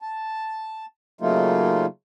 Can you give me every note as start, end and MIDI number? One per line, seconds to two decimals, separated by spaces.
0.02 0.86 81
1.21 1.86 49
1.21 1.86 54
1.21 1.86 57
1.21 1.86 58
1.21 1.86 63
1.21 1.86 65